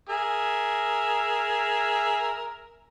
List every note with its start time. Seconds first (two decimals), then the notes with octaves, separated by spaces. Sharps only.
0.10 G#4 A#4 E5